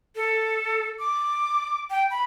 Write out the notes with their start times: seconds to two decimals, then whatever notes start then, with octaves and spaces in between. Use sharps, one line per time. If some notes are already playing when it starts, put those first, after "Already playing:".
0.16 A4
0.99 D6
1.90 G5
2.11 B5